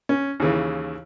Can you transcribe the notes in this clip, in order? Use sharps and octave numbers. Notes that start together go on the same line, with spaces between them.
C#4
D#2 C#3 E3